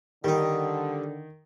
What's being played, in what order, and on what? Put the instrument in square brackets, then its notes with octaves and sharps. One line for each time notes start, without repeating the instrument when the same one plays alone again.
[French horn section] D3 [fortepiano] D#3 [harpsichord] G3 D#4